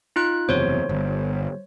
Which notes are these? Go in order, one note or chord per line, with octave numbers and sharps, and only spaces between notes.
D#4 F4 F#6
F#1 E2 C3 C5 C#5
G1